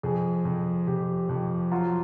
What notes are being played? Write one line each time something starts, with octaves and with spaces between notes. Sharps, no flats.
F2 G#4
F2
F2 G4
F2
F#3 F4